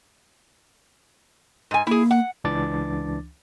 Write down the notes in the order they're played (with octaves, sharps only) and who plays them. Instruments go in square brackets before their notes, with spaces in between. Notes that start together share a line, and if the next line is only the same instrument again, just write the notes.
[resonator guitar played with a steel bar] G#2 G#5
[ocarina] A#3 [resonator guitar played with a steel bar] E4 G#4
[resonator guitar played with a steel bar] F#5
[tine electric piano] C#2 E3 D4 D6 A6